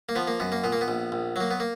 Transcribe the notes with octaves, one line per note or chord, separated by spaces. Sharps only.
A#3
F3 B3
A#3
F#2 B3
A#3
A#2 B3
A#3
B3
A#1
A#1
F#3 A#3
B3
A#3